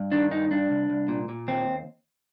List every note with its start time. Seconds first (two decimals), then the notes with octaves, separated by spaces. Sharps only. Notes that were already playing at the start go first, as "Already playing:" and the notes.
Already playing: G2
0.12 D#3 D4
0.31 G2 D#4
0.51 G2 D4
0.70 C2
0.90 C2
1.08 A#2
1.29 A#2
1.48 D#2 C4